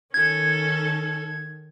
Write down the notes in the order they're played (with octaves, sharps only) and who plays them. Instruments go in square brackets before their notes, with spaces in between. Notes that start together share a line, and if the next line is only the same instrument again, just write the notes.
[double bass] D#3 [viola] C#4 A4 [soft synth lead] G#6